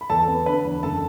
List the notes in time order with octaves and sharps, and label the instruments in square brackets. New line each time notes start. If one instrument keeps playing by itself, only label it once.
[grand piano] B5
E2 A4 A5
B3
D3 B4 B5
E2
F#1 A4 A5